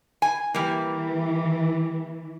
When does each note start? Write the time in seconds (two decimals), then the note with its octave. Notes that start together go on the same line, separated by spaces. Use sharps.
0.22 G#5
0.54 E3 G3 A#3